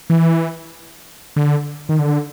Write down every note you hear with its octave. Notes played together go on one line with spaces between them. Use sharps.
E3
D3
D#3
D3